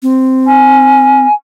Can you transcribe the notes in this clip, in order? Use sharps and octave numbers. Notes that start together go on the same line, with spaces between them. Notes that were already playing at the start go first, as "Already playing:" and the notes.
C4
G#5